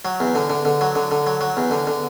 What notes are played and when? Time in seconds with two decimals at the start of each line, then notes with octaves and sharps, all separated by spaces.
0.05 F#3
0.20 E2
0.35 D3
0.50 D3
0.65 D3
0.81 F#3
0.95 D3
1.11 D3
1.27 F#3
1.41 F#3
1.57 E2
1.71 D3
1.87 D3